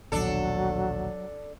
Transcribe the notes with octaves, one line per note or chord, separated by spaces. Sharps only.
A#1 D#2 B2 F#3 D4 A4